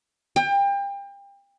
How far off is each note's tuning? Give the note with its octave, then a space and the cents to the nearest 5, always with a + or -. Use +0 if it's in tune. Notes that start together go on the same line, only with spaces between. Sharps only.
G5 +30